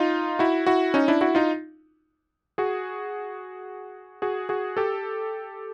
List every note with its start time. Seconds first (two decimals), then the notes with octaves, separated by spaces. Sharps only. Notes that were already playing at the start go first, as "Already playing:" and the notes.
Already playing: D#4 F4
0.39 E4 F#4
0.67 E4 F#4
0.94 C#4 D#4
1.08 D4 E4
1.21 E4 F#4
1.35 D#4 F4
2.58 F#4 G#4
4.22 F#4 G#4
4.49 F#4 G#4
4.77 G4 A4